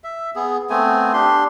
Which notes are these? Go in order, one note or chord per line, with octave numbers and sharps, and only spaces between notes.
E5
B3 G#4
A3 B3 C4 G#5
D4 G4 C6